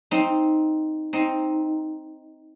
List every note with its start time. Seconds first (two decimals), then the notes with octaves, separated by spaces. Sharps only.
0.11 C4 D#4
1.13 C4 D#4